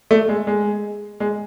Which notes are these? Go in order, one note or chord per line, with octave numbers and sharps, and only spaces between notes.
A3
G#3
G#3
G#3